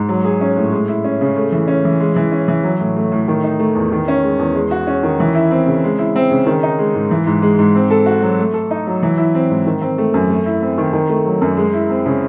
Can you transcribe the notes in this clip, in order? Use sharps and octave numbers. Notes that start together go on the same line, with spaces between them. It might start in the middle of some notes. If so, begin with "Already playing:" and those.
Already playing: G#2
F#3
G#4
C#4
A2
G#3
E4
C#4
C#3
A3
E3
C#4
E3
G#3
E3
C#4
E3
F#3
A2
A3
A2
D#3
D#4
A3
E2
D#3
C#4
G#3
E2
G#3
F#4
C#4
D#3
E3
E4
C4
C#3
G#3
E4
C4
C#3
D#3
D#4
G#3
G#2
E3
G#2
G#3
G#2
C4
A4
F#4
F#3
A3
A4
D#4
F#3
E3
E4
C4
G#2
D#3
C4
A3
F#2
A3
E4
C4
D#3
D#3
A3
F#3
F#2
G#3
E4
C4
C#3